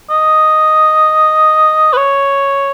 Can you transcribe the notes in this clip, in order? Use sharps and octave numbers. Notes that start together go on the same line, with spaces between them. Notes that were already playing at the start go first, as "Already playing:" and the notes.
D#5
B4
C#5